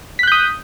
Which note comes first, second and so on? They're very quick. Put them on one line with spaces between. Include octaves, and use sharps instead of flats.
B6 F#6 G6 D#6